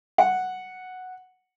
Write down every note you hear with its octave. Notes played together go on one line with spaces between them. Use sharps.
F#5